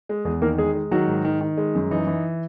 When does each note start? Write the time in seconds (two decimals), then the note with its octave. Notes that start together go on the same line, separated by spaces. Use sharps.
0.09 G#3
0.25 E2 G#3 G#4
0.42 D#3 A#3 A#4
0.58 G#3 G#4
0.75 G#3
0.91 D#3 F#3 F#4
1.08 G#2
1.25 D#3
1.41 D#3
1.57 G#3
1.75 F#2
1.91 E3 D#4
2.07 E3